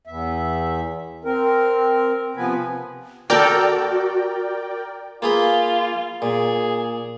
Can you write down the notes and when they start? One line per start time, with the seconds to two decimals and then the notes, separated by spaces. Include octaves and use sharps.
0.07 E2 E5
1.25 C4 A#4
2.37 C3 F3 B3 B4 G#5
3.30 F#4 A4 A#4 D5 G5 A#5
5.22 A#3 F4 G#4 B4
6.22 A#2 G#4